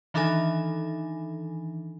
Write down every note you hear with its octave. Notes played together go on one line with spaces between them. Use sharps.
D#3 E3 D4 D#4 A4 G#5